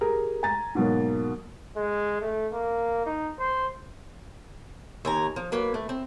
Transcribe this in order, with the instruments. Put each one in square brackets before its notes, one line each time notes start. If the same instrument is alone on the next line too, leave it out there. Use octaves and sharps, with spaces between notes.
[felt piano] G4 G#4 A#4 A#5
G#5 A#5 A6
G#2 B2 F#3 A#3
[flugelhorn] G#3
A3
A#3
D#4
C5
[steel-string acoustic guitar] D#2 G#5 A#5
F3
F#3 A#3 B4
A3
C4